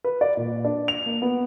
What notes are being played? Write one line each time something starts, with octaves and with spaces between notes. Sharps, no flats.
B4
D5
A#2
D4
F7
A#3
B3